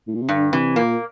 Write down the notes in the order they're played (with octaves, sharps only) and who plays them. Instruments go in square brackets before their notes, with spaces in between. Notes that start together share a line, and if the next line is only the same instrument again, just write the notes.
[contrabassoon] A2
A#2
C3
[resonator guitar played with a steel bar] G2 [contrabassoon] D3
[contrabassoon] C3 [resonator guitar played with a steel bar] E3
[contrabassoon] A#2 [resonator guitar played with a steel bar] A#3